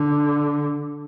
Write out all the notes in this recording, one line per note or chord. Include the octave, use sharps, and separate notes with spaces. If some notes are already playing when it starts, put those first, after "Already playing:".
Already playing: D3